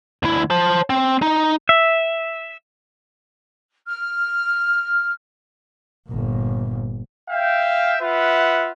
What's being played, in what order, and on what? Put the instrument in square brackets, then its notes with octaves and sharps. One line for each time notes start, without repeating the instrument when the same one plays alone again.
[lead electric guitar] D2 E4
C5 A5
C4
D#4
[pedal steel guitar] E5
[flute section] F6
[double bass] G1 A#2
[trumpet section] E5 F5 G5
F4 B4 E5 F#5